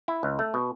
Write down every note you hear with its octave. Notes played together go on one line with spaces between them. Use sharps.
E4
C#2
A3
B2